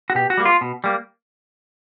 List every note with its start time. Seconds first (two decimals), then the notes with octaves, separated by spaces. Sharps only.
0.10 F#4
0.15 B2 G4
0.30 F#4
0.37 G3 A#3
0.45 F4
0.61 B2
0.84 G3 A#3